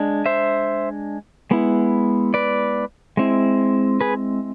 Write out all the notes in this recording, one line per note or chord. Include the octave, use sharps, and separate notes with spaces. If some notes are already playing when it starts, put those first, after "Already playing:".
Already playing: G#3 D4
C5 E5
G#3 B3 E4
B4 D5
G#3 C4 E4
G#4 B4